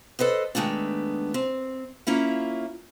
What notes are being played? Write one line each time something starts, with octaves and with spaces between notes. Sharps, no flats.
A4 B4 C5 D#5
D#3 G#3 A3 B3 D4
C4
A#3 C#4 E4 F4